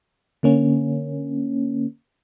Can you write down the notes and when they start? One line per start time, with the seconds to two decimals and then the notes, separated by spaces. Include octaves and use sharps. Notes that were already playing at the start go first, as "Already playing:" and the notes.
0.43 D3 A#3 C#4